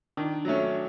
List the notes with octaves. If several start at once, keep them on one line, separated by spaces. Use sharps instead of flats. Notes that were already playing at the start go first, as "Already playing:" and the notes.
D#3 D4
F#3 A3 C#4